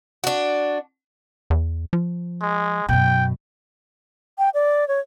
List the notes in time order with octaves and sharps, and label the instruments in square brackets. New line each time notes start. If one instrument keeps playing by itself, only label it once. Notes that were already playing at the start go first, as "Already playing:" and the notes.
[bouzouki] D4 F#4
[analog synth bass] E2
F3
[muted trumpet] G#3
[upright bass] F#2 B2 [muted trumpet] G5
[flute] G5
D5
C#5